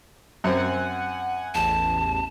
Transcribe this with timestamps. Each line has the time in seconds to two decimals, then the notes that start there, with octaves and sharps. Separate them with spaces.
0.44 F#2 C4 F#5 G#5
1.55 A1 E2 A5